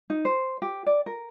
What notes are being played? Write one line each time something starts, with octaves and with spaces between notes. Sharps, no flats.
D#4
C5
G4
D5
A#4